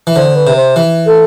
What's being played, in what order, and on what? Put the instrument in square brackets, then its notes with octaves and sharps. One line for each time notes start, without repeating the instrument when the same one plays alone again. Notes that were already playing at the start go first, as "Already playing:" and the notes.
[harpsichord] E3
[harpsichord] D3 [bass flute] C5
[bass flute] B4
[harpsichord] C3
[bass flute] C5
[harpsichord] E3
[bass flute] A4